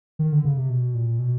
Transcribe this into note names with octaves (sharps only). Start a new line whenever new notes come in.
D#3
D3
C#3
C3
B2
A#2
B2